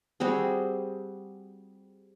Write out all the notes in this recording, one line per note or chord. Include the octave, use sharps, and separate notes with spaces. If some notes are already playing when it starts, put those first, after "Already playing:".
G3 C4 F#4 G#4